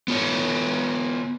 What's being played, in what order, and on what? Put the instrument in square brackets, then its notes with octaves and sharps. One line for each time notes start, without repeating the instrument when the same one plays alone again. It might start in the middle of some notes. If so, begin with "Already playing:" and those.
[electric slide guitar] B3 F4 C#5